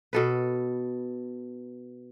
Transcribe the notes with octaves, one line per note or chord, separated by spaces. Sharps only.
B2 A4 B4